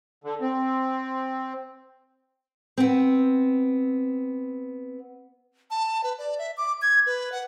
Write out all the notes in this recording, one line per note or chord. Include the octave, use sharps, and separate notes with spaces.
D3
C4
B3 C4
A5
B4
D5
E5
D6
G#6
B4
F#5